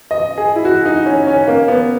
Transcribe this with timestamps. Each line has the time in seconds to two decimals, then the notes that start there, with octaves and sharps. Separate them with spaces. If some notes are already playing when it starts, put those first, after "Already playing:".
0.11 D#5
0.38 G#4
0.56 E4
0.65 F#4
0.85 D#4
1.06 C#4
1.27 C#4
1.47 A#3
1.68 B3